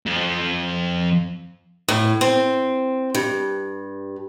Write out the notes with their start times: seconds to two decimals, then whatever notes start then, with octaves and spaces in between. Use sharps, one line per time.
0.06 F2 F3
1.88 A2
2.21 C4
3.15 G2